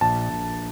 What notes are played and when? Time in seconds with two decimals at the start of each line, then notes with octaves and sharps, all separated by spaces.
0.01 A#1 A5
0.30 A#1